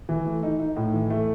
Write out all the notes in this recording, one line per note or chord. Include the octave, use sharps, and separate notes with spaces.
E3
A3
D#4
D#4
A2
E3
A3